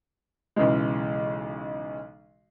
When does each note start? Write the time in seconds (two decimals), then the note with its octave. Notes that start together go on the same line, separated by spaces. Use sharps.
0.56 B1 C#3 E3 G#3